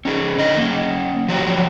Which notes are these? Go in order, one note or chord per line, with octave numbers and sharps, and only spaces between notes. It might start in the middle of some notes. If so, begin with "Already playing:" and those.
C#4 D#4 G4 G#4
D3 D#5
A#3 C#4
F3 F#3 F#4 G4